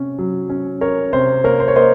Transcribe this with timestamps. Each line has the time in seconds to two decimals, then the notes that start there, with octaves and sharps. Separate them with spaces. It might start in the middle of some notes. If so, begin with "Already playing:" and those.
Already playing: C3 C#4
0.18 F#3
0.50 C#4
0.81 C#4 A#4 C#5
1.13 C3 C5
1.44 A#3 A#4 C#5
1.60 C5
1.68 C#5
1.76 A#3 C5 D#5